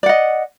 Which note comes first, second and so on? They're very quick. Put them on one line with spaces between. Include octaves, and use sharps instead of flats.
D5 F#5 D#5